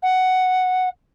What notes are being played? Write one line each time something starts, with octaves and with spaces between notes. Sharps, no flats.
F#5